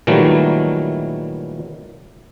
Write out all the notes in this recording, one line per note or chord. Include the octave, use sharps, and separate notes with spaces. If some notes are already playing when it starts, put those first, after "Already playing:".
A#2 D#3 E3 F#3 G3 A3